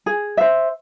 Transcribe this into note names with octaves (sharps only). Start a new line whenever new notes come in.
G#4
C5 E5